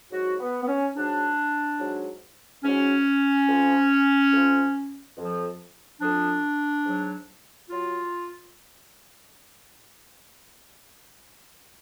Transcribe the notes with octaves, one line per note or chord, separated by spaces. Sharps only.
G#2 F#3 F#4
B3
B3
C#4
G#2 F#3 D4
G#2 F#3
G#2 F#3 C#4
F2 F3
F2 F3
F2 F3
F2 F3 D4
G#2 F#3
F#3 F4